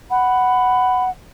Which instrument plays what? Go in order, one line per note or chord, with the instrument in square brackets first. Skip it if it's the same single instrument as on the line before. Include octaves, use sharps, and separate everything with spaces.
[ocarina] F#5 [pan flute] B5